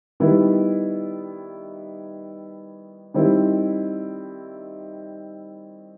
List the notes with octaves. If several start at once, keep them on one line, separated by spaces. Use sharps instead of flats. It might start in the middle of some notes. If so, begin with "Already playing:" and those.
D#3 G3 B3 E4
D#3 G3 C4 E4